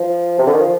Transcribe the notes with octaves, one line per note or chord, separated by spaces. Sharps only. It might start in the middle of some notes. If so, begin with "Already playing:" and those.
Already playing: F3
C3
D3
D#3
F3